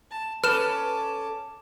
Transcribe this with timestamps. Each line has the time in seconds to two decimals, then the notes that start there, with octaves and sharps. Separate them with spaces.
0.11 A5
0.44 C#4 A4 B4 A5 D6 F6 E7